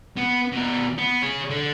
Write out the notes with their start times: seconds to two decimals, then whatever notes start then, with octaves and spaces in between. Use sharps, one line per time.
0.17 B3
0.52 B2 A#4
0.98 B3
1.22 G#4 C#5
1.50 D3